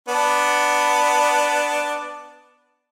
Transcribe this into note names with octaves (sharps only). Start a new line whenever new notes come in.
B3 D4